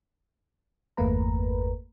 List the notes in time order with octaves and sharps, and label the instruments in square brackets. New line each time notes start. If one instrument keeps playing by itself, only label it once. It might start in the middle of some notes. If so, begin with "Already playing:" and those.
[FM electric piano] G1 E2 A3 A#3 B4 A#5